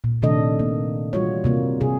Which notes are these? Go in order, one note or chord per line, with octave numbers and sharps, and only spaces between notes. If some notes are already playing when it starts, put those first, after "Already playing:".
A#2
C3 D#3 A3 D4 A4 D#5
A#3
E3 G3 F4 F#4 C#5
C3 A#3 F4
C3 G#4